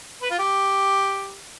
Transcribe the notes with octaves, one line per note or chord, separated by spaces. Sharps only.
B4
F4
G4